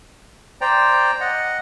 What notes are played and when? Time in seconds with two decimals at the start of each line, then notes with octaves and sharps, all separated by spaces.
0.61 C5 D5 G5 A#5
1.20 D#5 F#5